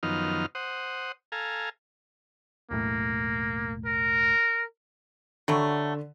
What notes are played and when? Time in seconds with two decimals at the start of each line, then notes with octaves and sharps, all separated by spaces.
0.03 F#2 D#3 F3 B3 D#4 F6
0.55 C5 F#5 D#6
1.32 A4 F5 G#5 A#5
2.71 E1 B1 A2 A#3
3.86 A#4
5.48 D3 F#3 G3 A3